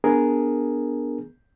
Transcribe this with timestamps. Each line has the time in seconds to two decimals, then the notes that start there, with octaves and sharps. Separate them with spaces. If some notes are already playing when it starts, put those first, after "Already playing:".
0.04 B3 D4 G#4 A#4